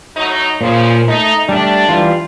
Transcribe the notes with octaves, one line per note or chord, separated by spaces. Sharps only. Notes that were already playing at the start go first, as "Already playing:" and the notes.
A2 F#3 D#4
A#2 C#3 F3
A3 D#4
G3 A3 D4
E3 G3 F4